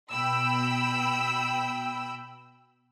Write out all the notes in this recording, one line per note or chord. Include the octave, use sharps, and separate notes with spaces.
B2 G5 B5 E6